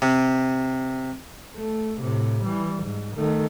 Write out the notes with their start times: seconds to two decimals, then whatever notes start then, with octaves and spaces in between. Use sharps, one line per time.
0.02 C3
1.56 A3
1.99 A2 C3
2.44 E3 G3
2.83 G#2
3.16 D#3 A3